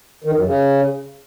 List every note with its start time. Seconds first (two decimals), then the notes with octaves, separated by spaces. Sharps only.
0.24 D#3
0.35 F#2
0.46 C#3